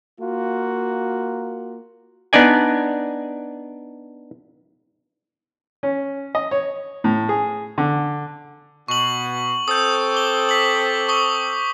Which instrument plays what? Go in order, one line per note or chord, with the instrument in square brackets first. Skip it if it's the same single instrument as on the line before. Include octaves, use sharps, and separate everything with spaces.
[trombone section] A#3 F4 F#4
[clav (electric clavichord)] B3 D4 D#4 D5 G#5
[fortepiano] C#4
D#5
C#5
A2
G#4
D3
[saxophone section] B2 [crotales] C#6 F#7
[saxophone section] C4 A4 [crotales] D#6 G6
[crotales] D6 G7
B6 F#7
C#6 D#6 G7